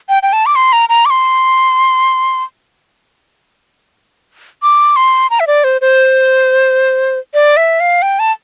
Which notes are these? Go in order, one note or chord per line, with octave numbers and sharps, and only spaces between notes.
G5
G5
A5
D6
C6
A#5
A#5
D6
C6
D6
C6
A#5
E5
D5
C5
C5
D5
E5
F5
G5
A5